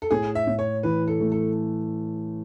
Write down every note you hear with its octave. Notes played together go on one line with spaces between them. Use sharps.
A4
A2 G#4
E5
A2
C#5
E3 B4
A4
A3
A4